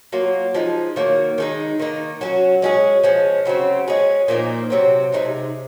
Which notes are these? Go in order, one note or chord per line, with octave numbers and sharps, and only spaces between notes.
F#3 A#3 F4
F3 G#3 D#4
D#3 F#3 A#3
D#3 G#3 D#4
D#3 A#3 D#4
F#3 C#4 F#4
G#3 C#4 F4 G#4
F3 G#3 C#4
C#3 F#3 C4
G#3 C#4 G#4
A#2 F3 A#3 D#4
C3 F#3 C4
C3 D#3 G#3 D#4